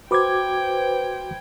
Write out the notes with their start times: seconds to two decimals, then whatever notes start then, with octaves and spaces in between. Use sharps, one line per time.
0.11 F#4 B4 C5 G5 D6 G#6